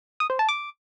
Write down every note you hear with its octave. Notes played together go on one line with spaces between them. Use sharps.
D#6
C5
A5
D6